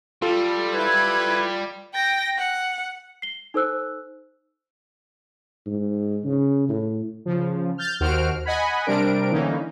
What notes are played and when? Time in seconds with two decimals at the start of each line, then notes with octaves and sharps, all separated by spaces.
0.22 G3 F4 A4
0.74 E4 B4 G#6
1.94 G5 A#6
2.38 F#5
3.22 C7 G7
3.54 D#4 A4 C5 E6 F#6
5.66 G#2
6.25 C#3
6.69 A2
7.26 C#3 F3
7.78 F6 G6 A6
8.00 D#2 F#4 C5 F6 D7
8.45 D#5 F#5 G#5 B5
8.86 C3 G3 C4 D4 A#4 D7
9.32 D3 E3 A#3 C#4 D#4